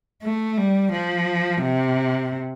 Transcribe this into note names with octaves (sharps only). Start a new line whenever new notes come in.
A3
G3
F3
C3